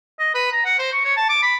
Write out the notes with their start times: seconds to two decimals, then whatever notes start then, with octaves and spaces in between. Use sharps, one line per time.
0.19 D#5
0.35 B4
0.52 A#5
0.65 F#5
0.79 C5
0.93 C#6
1.05 C#5
1.17 A5
1.29 D6
1.43 B5